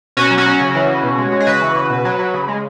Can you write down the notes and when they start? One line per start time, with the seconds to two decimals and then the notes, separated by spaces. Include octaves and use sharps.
0.17 B2 C#4 F#4
0.31 F#3
0.38 C#4 F#4
0.46 F#3
0.61 C#3
0.75 E3
0.89 C#3
1.03 B2
1.18 G#3
1.32 G#3
1.40 G#4
1.47 C#3 F#4 B4
1.61 E3
1.75 C#3
1.90 B2
2.05 F#3
2.19 F#3
2.34 C#3
2.48 G#3